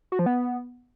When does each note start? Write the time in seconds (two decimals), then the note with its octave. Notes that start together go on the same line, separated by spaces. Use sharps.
0.12 F#4
0.19 F3
0.26 B3